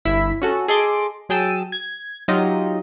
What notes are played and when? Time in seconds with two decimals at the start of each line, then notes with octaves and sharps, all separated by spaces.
0.05 G1 E4 B6
0.42 C#4 F#4 A4
0.68 G#4 A4 D#5 C6 D6
1.29 F#3 G#4 G5 A5 E6 D#7
1.72 G#6
2.28 F#3 D#4 F4 G4 D#5